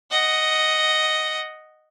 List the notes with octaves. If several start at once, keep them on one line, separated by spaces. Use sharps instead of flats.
D#5 F#5